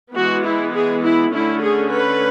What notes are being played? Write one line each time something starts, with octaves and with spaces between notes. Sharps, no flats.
E3 G#3 B3 F#4
E4
G#4
E4
D3 A3 C#4 E4
G#4
B4